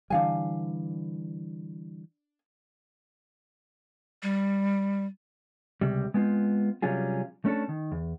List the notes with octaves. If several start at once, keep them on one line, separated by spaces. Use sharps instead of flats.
D3 E3 G3 D4 F5 G#5
G3
C#2 C3 G3
G#3 B3 C4 F4
C3 F#3 G3 C#4 F4 G#4
A3 C#4 D4 A4
D#3
E2